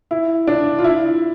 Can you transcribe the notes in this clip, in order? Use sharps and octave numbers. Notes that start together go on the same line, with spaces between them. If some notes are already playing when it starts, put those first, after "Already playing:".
E4
D4
F4
E4